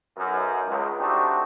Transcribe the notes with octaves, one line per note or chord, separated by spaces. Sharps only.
B1 F#2
C#2
A3 C4 D4 D#4 F#4 G4